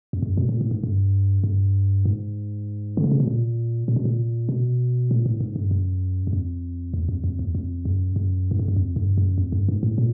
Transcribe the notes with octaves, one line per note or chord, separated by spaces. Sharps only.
F2
F#2
B2
A#2
A2
G#2
G2
G2
G#2
D3
C#3
C3
B2
A#2
A#2
B2
A#2
B2
A#2
A2
G#2
G2
F#2
F#2
F2
E2
F2
F2
E2
F2
F#2
F#2
G#2
G2
F#2
F2
G2
F#2
F2
G2
G#2
A2
A#2